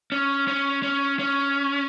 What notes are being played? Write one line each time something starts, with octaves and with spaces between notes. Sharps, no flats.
C#4
C#4
C#4
C#4